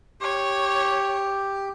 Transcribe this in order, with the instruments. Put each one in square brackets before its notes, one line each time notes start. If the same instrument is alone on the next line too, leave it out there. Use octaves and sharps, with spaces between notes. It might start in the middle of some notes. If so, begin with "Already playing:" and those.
[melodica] G4 [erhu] C#5